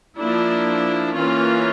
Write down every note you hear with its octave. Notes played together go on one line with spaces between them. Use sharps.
F3 A#3 D4 E4
E3 A#3 C#4 F4